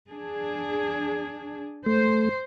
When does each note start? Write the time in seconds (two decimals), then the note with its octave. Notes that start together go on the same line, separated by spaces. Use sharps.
0.11 D4 G#4
1.86 A3 C5